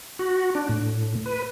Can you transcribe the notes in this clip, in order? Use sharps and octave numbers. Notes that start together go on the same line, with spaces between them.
F#4
D4
A2
B4